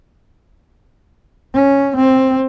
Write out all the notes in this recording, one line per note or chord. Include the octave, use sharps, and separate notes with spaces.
C#4
C4